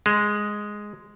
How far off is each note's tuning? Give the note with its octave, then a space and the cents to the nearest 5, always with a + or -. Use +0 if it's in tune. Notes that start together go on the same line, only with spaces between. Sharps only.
G#3 +0